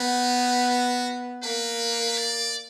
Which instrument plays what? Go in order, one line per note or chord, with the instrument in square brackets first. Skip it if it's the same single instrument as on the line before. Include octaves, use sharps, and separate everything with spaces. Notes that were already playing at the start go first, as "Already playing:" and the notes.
Already playing: [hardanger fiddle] B3 [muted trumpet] D#4
[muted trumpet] F#4
[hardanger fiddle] A#3 [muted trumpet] B4
[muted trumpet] D5